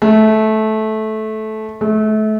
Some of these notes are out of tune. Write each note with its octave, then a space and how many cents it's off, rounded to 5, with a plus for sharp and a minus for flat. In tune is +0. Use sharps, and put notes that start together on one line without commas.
A3 -15
A3 -30